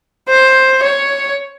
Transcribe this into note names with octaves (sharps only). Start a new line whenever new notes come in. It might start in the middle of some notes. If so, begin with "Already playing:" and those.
C5
C#5